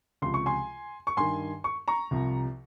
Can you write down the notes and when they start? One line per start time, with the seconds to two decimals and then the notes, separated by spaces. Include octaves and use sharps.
0.22 C#2 C3 F3 C6
0.34 C#6
0.46 G#5 C6
1.07 C#6
1.17 G2 D#3 G#5 C6
1.64 C#6
1.88 A#5 C#6
2.11 C2 C3 F3